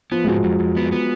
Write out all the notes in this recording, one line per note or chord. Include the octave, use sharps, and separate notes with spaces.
F3 B3
G#3
G#2 F#3
F2
F2
B3
B3